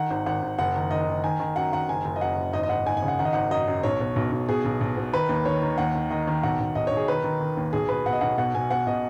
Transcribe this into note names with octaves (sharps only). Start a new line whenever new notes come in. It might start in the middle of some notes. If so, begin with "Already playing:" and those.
Already playing: D#3 F#5
G#1
G#1 F#5
G#1
F#1 F#5
D#3
D#3 D#5
D#3
D#3 G#5
D#3
F#2 F#5
D#3 F#5
F#1 G#5
F#1
D#5
F#2 F#5
F#1
G#1 D#5
D#5
G#1 F#5
G#1 G#5
G#5
C#3
F#5
D#3 F#5
D#5
G#1 F#5
F#2 D#5
F#2
B1 C#5
B2
B1
B1
B2 G#4
B1
B1
B2
D#3 B4
D#2
D#3 C#5
D#3
D#2 F#5
D#3
D#3 D#5
D#3
B1 F#5
B1
B1 D#5
B1 C#5
G#4
D#3 B4
D#3
D#3
D#2
B1 G#4
B2 B4
B2 F#5
D#5
B1 F#5
B2 F#5
B2 G#5
B2 F#5
B2 D#5